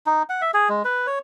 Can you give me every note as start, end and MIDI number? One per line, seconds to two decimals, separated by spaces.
0.06 0.23 63
0.30 0.41 78
0.41 0.51 76
0.54 0.69 68
0.69 0.83 56
0.85 1.07 71
1.07 1.19 73